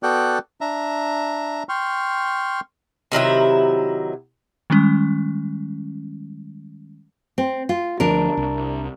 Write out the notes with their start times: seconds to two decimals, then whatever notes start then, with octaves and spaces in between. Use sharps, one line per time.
0.03 B3 F#4 A4 D5 G5 F#6
0.61 D4 E5 A#5
1.69 G5 C6 C#6 F6
3.12 C3 D#3 F#3 E4
4.70 D#3 G3 G#3 C#4
7.38 C4
7.69 F4
8.00 D2 F3 D4 A#4
8.37 C2